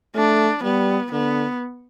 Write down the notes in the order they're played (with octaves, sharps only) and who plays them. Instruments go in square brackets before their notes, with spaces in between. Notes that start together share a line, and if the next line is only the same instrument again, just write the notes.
[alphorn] A3 [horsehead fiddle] D4
[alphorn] G3 [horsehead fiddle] B3
[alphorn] D3 [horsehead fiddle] B3